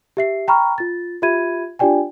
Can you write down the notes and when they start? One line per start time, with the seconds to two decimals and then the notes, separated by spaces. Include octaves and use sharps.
0.17 G4 E5 C7
0.48 G5 A#5 B5 C#6 F6
0.78 F4 A6
1.22 F4 G4 E5 B5 G#6 D#7
1.79 D4 F4 G4 D5 G5 G#5